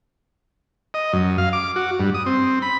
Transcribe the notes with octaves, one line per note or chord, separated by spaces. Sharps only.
D#5
F#2
F5
D6
F#4
G2
D#6
C4
B5